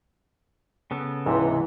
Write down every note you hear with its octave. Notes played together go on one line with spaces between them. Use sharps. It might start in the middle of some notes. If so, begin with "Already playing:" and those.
C#3 B3 A4
C#2 G#2 C3 E3